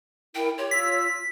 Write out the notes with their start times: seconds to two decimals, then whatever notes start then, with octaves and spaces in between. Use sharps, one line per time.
0.35 E4 A#4 G5
0.58 G4 C#5 C6
0.71 F4 E6 B6